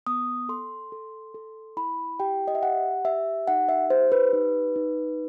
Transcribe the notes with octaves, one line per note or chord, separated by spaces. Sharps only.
B3 D#6
A4 C6
A4
A4
E4 B5
G4 G5
D#5
E5
G4 F#5
G4 E5
D#4 F#5
E5
G4 C5
B4
D#4
D#4